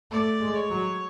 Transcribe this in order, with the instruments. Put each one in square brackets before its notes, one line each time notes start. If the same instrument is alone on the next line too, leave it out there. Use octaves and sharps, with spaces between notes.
[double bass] A3 [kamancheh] D5
[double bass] G#3
[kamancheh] C#5
[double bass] F#3